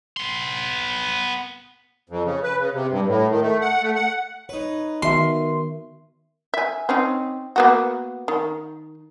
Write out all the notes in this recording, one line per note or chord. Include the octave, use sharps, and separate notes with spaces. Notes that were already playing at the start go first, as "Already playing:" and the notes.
B3 C6
F2
C#3
B4
C#3
C3
G2
A2
D#3
A3
F#5
A3
F#5
D#4 B4 C#5
D#3 B3 F#4 A#4 E5 C6
E5 G#5
C4 C#4 D#4
A#3 B3 F#4
D#3